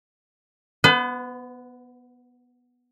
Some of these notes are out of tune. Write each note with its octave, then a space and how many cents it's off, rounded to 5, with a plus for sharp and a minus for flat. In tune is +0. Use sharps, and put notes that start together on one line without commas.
B3 -5 B4 +40